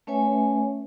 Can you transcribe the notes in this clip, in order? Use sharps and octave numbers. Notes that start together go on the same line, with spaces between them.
A3 C#4 B4 C#5 E5 G#5